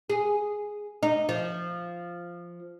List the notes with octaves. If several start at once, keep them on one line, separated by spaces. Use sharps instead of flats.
G#4
D#4
F3